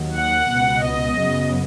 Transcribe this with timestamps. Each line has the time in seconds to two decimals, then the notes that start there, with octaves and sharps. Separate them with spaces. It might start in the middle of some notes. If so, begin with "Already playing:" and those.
Already playing: D#2 D#3 F#3
0.15 F#5
0.49 C#2 B2 B3
0.83 D#5
1.17 F#2 C#3 F#3 B3